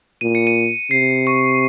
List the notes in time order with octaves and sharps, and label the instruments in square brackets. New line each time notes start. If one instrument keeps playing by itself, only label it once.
[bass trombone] A#2 [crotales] D#7
[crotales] C#7
D#7
[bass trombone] C3 [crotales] C7
[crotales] C#6